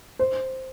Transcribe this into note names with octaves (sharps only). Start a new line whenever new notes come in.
C5